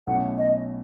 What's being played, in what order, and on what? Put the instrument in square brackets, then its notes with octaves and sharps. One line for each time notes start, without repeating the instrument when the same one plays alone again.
[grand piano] B1 B2 A3 C#4 E4 [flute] F#5
[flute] D#5